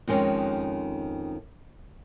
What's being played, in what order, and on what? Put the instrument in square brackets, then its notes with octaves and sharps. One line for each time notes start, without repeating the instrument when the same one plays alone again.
[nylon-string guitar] F2 D#3 G#3 C#4